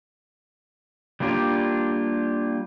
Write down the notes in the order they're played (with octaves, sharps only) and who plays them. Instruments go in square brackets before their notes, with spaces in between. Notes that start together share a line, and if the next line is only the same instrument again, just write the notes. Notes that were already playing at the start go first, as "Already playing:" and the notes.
[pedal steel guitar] G3 A#3 D4 F4 G4